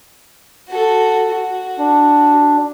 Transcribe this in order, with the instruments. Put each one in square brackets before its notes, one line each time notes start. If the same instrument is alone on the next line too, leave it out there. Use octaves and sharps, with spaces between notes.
[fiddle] F#4 A4
F#4
[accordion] D4